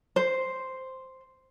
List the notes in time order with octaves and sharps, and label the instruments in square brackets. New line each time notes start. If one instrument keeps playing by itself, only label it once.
[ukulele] C5